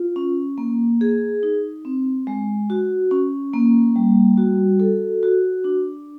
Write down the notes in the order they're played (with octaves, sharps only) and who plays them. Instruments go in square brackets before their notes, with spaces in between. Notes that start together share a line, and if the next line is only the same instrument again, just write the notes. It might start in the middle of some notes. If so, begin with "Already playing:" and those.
Already playing: [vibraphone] F4
C#4
A#3
G#4
D#4
C4
G#3
F#4
C#4
A#3
G3
F#4
A4
F#4
D4